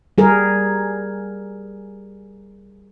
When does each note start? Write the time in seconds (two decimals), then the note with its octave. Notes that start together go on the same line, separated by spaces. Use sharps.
0.18 G3 G#4 A#4